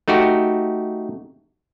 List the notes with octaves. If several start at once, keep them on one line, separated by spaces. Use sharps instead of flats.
A3 D#4 F#4 G4